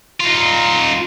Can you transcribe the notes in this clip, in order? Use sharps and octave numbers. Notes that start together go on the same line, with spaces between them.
D#4 F4